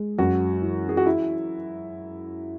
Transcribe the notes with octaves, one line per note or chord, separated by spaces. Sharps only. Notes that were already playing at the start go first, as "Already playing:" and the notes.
Already playing: G#3
F#2 F#4
E3
G#4
F#4
E4